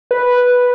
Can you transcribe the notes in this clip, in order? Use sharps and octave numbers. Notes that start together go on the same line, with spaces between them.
B4